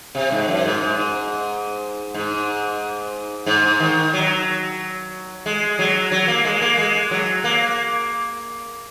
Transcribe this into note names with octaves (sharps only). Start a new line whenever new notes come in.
C3
G#2
F#2
G#2
G#2
G#2
G#2
D#3
F#3
G#3
F#3
F#3
A#3
G#3
A#3
G#3
F#3
A#3